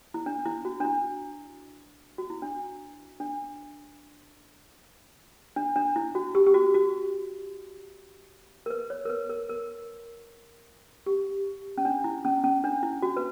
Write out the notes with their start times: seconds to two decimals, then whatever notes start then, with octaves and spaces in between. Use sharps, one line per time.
0.14 E4
0.26 D4
0.45 E4
0.65 F#4
0.80 D4
0.85 E4
2.18 F#4
2.30 E4
2.42 D4
3.20 D4
5.56 D4
5.76 D4
5.96 E4
6.15 F#4
6.35 G4
6.47 G4
6.54 F#4
6.74 F#4
8.66 A#4
8.70 B4
8.90 C#5
9.05 A#4
9.09 B4
9.29 A#4
9.49 A#4
11.06 G4
11.78 C#4
11.85 D4
12.04 E4
12.25 C#4
12.44 C#4
12.64 D4
12.83 E4
13.02 F#4
13.17 B4